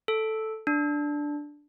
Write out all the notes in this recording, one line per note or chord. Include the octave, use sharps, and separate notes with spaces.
A4
D4